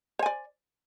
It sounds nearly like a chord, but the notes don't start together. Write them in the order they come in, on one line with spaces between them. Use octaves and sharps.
C5 G#5 D5